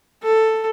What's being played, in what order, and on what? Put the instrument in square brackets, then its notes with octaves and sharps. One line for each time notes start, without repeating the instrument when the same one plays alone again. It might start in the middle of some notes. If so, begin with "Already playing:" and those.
[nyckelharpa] A4